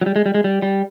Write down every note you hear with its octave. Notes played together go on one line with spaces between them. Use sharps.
F#3
G3
G#3
G3
G#3
G3
G3